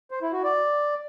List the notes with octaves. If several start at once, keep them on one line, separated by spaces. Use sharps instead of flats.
C5
E4
F#4
D5